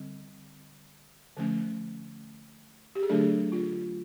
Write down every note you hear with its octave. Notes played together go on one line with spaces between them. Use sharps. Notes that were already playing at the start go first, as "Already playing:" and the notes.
Already playing: D3 G3 C4
D3 F3 A3 C#4
G4
G#4
D3 F#3 A3 D4 A4
F4